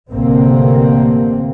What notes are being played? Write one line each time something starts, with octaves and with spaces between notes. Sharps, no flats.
A1 D2 C3 A#3 C4